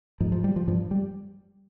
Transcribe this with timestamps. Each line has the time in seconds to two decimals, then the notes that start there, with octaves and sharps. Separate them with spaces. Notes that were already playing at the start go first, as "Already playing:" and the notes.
0.21 G#2 F3
0.32 F3
0.44 G3
0.56 F3
0.67 G2 F3
0.91 G3